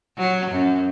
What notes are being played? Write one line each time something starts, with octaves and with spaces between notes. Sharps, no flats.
F#3
F#2